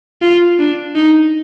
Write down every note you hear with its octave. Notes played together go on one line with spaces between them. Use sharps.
F4
D4
D#4